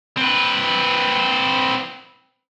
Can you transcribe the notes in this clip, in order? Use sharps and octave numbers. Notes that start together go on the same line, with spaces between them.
C4 B4